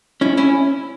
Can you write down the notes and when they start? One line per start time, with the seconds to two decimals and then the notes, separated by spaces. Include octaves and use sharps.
0.21 C#4 E4
0.37 C#4 E4